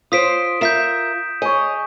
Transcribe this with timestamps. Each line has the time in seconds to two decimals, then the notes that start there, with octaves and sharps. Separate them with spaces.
0.12 F4 C5 D#6 B6 D7
0.61 F4 A#4 E5 G6 B6 E7
1.42 G#4 C#5 D#5